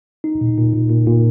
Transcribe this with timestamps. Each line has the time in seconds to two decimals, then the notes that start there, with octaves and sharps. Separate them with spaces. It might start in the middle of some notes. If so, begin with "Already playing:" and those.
0.24 D#4
0.41 A#2
0.58 A#2
0.73 A#2
0.90 A#2
1.07 A#2